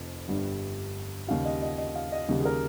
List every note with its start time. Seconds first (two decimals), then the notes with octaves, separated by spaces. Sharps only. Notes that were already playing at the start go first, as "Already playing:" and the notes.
Already playing: F1 F2
0.28 G1 G2 G3
1.28 D#2 C#3 G3 F5
1.45 D#5
1.62 D#5
1.78 D#5
1.95 F5
2.12 D#5
2.29 D#2 C#3 G3
2.40 G#4
2.45 A#4